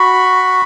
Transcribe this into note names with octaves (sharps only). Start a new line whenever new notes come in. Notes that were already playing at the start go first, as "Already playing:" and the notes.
Already playing: F#4 B5